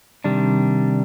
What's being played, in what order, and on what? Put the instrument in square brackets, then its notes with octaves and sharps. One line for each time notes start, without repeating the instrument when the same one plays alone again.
[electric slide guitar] C3 D#3 G3 D4